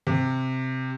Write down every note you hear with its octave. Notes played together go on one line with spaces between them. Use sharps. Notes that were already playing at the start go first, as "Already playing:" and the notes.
C3